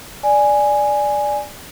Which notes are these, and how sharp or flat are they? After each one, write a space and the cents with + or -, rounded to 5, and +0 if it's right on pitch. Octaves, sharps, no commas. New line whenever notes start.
D5 +0 G#5 +0